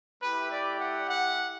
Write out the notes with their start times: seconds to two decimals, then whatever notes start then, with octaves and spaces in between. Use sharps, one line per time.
0.22 A3 E4 G4 B4
0.51 D5
0.80 F#5
1.09 F#5